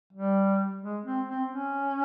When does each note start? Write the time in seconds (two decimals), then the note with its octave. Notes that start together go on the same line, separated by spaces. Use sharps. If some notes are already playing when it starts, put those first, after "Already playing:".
0.13 G3
0.82 G#3
1.05 C4
1.28 C4
1.51 C#4